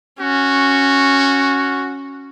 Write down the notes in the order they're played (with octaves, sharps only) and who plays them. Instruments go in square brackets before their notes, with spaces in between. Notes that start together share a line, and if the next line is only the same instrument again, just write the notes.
[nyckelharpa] C#4 [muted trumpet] F#4